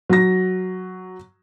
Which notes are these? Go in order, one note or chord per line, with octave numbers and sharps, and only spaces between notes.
F#3 A#6